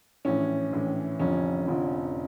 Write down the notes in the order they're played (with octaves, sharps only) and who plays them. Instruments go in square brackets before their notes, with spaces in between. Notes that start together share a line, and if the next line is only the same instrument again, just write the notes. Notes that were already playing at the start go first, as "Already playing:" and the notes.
[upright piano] A#1 A2 E3 C#4
A#1 A2 E3
F1 F2 D3 F3 C#4
F1 F2 D3 F3